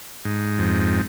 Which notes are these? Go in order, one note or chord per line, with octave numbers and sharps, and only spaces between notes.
G#2
F2